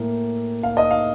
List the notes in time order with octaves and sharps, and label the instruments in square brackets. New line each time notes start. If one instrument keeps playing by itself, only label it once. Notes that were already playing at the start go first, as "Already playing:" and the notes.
Already playing: [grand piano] A2 A#3
F5
D#5
F5